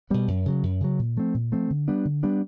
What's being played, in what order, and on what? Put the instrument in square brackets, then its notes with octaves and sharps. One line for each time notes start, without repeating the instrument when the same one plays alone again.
[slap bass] B2 G3 B3
F#2
C#3 F#3
F#2
C#3 F#3
A#2
F3 A3 C4
A#2
F3 A3 C4
D3
G3 B3 D4
D3
G3 B3 D4